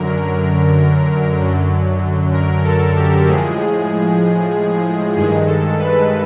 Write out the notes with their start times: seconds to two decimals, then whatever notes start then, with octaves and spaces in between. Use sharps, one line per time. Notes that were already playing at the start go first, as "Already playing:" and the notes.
Already playing: F#2 D3 F#3 A#4
1.40 F#2 D3 F#3
2.33 A#4
2.65 A4
2.96 G4
3.28 A2 F3 G#3 G#4
5.17 G2 D#3 G#3 G#4
5.48 A4
5.79 B4